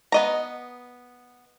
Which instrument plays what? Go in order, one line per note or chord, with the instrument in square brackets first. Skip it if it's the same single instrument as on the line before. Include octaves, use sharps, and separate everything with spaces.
[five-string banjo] B3 D#5 A#5